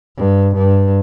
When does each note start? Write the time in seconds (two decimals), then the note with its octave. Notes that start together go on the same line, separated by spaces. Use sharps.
0.17 G2
0.55 G2